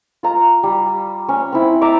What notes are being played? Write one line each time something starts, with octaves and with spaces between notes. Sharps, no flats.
F4 A#5
G3
C#4
C4 E4
E5 A5 A#5 D6